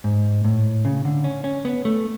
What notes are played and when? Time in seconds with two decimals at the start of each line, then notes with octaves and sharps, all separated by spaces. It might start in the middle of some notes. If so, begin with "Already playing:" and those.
0.04 G#2
0.44 A2
0.85 C#3
1.05 D3
1.24 C#4
1.44 C#4
1.65 B3
1.85 A3